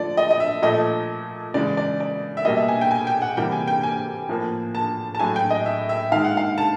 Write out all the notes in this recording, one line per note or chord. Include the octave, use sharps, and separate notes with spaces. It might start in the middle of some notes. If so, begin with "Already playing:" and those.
Already playing: D3 F3 A3 D5
D#5
D#5
E5
A#2 F3 A3 D#5
C#3 E3 G#3 D5
D5
D5
E5
B2 G3 A#3 D#5
E5
G#5
G5
G#5
G5
F#5
C3 E3 G3 A#3 G5
G#5
G5
G#5
A2 F3 A#3
A5
A5
A2 F#3 A3 G#5
G5
D#5
E5
E5
D#3 G#3 F5
F#5
F5
A5